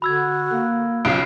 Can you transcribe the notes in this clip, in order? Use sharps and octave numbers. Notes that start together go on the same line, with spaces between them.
D3 F#4 B5 E6 G#6
A#3
B1 C#3 F4 C7 D7